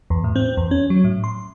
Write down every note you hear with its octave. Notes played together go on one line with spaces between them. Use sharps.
E2
A2
C4
E2
C#4
F#3
A2
C6